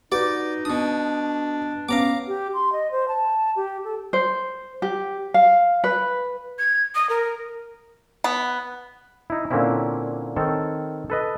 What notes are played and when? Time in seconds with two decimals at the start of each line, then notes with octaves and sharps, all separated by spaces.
0.12 D#4 F#4 B4 D5 D6
0.65 B2 D4 D#6
1.89 B3 C#4 F5 A#5 D6
2.27 G4
2.54 C6
2.73 D#5
2.91 C5
3.08 A5
3.56 G4
3.84 A4
4.13 C5
4.82 G4
5.34 F5
5.84 B4
6.59 G#6
6.95 D#6
7.10 A#4
8.24 B3
9.30 D#4 E4
9.51 A#2 D3 A#3 C4 C#4 E4
10.36 D#3 C4 A4 C#5
11.10 A4 B4 D#5